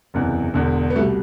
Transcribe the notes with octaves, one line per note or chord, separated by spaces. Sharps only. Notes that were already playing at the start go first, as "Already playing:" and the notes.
F#1 E2 C3 E3
E1 E2 D3
B3
C2 B2 G3 A3